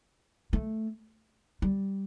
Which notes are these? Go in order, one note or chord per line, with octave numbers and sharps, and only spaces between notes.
A3
G3